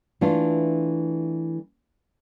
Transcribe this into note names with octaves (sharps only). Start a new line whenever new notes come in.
E3 A3 D4 F4